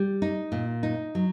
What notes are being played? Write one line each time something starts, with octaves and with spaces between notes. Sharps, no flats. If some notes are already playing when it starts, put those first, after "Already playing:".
Already playing: G3
D#4
A#2
D#4
F#3